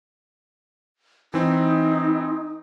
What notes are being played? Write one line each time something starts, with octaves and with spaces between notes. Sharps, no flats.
E3 C4 D#4